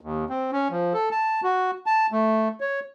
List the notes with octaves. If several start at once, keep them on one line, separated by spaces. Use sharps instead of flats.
D#2
C4
C#4
F3
A4
A5
F#4
A5
A3
C#5